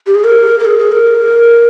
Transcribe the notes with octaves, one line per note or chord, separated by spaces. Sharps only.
G4
G#4
A#4
A#4
G#4
G#4
A#4